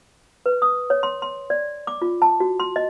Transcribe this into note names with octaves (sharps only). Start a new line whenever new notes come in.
B4
D#6
C#5
C6
C6
D5
D6
F4
A5
F#4
C6
D#5